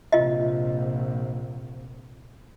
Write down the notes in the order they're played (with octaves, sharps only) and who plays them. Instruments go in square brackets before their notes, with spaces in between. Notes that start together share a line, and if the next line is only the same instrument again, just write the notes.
[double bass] A#1 C3 [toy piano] F4 D#5